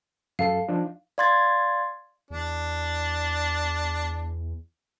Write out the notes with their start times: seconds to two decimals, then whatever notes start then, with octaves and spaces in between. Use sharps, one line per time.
0.39 F#2 A4 F5
0.68 F3 D4 D#4
1.18 D5 F5 C6 G#6 A6
2.30 E2 D4